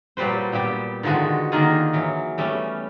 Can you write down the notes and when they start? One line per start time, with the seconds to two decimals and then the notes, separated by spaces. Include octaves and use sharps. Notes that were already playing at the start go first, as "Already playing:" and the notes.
0.17 A#2 F#3 G3 B4 C5
0.52 A#2 G3 B3 G4
1.03 D3 D#3 F3 G#3 F#4
1.52 D3 D#3 A#3 D#4 F4 G#4
1.93 E3 F#3
2.38 G3 A3 B3 C#4